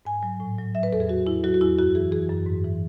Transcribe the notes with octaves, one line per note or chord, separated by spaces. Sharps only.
G#2 G#5
F#3
A2
F#3
F#3 E5
B4
E2 A4
G#4
F#3 F#4
E2 E4
F#3 F#4
F#4
E2 E4
F#2 F#4
E3 G#4
E3 G#4
F#2
G#2
E3